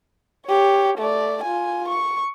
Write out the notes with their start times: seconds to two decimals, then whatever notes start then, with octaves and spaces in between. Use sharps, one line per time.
0.46 G4 C#5
0.98 A3 D5
1.43 F4 G#5
1.88 C#6